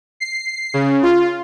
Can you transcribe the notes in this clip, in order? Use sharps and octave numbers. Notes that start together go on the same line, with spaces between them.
C7
C#3
F4